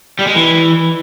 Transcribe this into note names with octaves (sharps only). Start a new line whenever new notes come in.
G3
G#3
E3